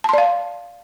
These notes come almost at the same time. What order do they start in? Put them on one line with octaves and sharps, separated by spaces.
A5 C6 D5 F5